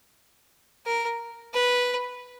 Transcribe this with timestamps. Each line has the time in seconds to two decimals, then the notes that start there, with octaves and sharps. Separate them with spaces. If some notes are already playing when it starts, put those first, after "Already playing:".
0.86 A#4
1.54 B4